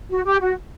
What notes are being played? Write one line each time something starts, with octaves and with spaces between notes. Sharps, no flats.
F#4
G4
F#4